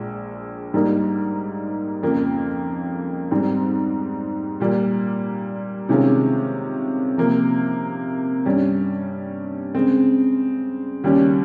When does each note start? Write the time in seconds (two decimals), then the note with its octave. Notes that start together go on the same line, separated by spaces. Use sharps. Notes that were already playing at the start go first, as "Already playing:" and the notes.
Already playing: A#1 A#2 G#3
0.74 G#2 G3 A#3 D#4
2.03 F2 C#3 F3 A#3
3.31 G#2 G3 C4
4.60 A#2 G3 A#3
5.89 C3 D#3 G#3 C#4 F4
7.18 C3 F3 A#3
8.45 G2 G3 C#4
9.75 C#3 G#3 C4
11.04 D#2 C#3 G3 C#4 G4